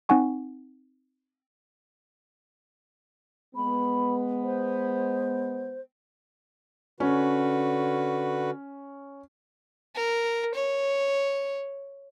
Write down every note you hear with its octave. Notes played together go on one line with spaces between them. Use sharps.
C4 D#4 F#5 G#5 C#6
G#3 B3 B5
C5
D3 C#4 F#4 B4
A#4
C#5